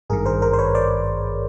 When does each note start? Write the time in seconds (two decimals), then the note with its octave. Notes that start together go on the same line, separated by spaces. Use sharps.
0.10 G#1 G2 D#3 G#4 A#4
0.26 A#4 C5
0.42 A#4 C5
0.53 C5
0.59 B4 C#5
0.75 C5 D5